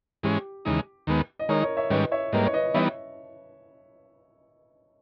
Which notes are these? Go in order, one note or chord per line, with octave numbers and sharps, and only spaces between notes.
G#2 E3 G#3 C#4 G4
D#2 C#3 E3 G#3 D#4
D#2 D#3 G#3 B3
D#5
D#3 G#3 D#4 A#4 C#5
A#4 C#5
C#5 E5
G#2 D#3 G3 C#4 B4 D#5
C#5 E5
G#2 G3 A#3 B4 D#5
C#5
B4 D#5
E3 G3 B3 D#4 C#5 E5